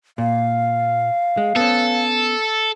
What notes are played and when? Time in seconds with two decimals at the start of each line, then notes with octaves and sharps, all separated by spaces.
0.18 A#2 F5
1.37 G#3
1.56 B3 C#4 A4